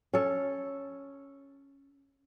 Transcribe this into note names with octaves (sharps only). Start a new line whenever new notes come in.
C#4 A4